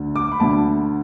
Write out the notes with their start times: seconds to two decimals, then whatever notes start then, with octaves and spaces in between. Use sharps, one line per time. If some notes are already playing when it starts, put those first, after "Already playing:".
Already playing: D2 D3
0.16 D6
0.32 B5
0.40 D2 D3 A5